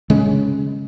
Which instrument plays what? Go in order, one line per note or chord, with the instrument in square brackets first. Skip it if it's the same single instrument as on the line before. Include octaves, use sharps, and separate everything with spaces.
[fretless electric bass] C#3 G#3 C#4